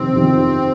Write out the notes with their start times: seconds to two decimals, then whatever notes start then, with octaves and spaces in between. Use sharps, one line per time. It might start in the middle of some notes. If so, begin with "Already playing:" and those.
Already playing: F2 C3 D#3 C4
0.14 F2 C3 D#3